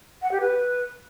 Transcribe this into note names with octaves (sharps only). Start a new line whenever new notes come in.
F#5
G4
B4